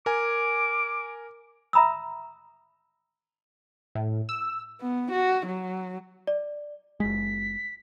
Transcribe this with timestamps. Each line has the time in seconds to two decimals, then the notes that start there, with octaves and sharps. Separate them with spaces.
0.06 A#4 G#5 D6
1.73 E5 A#5 B5 D#6 E6
3.95 A2
4.29 E6
4.81 B3
5.12 F#4
5.46 F#3
6.27 D5
7.00 F#1 G#3 B6